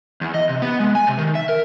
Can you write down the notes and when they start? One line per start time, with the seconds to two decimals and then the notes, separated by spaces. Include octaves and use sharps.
0.21 E2
0.34 D#5
0.49 C3
0.62 B3
0.79 G#3
0.95 G#5
1.07 C3
1.18 D#3
1.35 E5
1.49 A#4